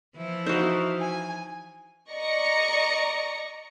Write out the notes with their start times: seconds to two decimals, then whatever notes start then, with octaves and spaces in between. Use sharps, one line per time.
0.16 E3 F3 E4
0.46 D#4 F#4 C5 F5 C6
1.01 G#5
2.11 D5 D#5 A#5 C#6 A#6 C#7